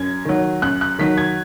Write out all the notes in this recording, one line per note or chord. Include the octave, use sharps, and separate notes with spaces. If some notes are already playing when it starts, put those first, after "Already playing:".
Already playing: F#2 G#6
D#3 F#3
F#2 F#6
F#6
D#3 F#3 B6
G#6